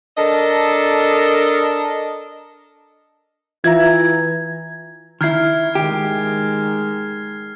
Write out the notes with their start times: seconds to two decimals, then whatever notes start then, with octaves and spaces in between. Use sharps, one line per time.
0.17 D4 A4 A#4 D#5
3.64 E3 F4 E5 A#5 G#6
5.21 D#3 E4 F6 G#6 C7
5.75 D#3 G#3 G4